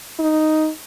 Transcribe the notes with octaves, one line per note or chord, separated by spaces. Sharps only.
D#4